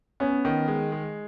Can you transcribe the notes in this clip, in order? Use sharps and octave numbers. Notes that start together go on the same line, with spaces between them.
B3 C#4
D#3
G#3
G#3